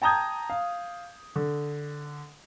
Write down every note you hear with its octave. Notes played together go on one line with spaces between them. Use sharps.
G5 A5 A#5 D#6 G6 G#6
F5
D3